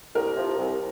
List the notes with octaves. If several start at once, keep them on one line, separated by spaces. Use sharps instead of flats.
C2 A#4
C3 F3
C2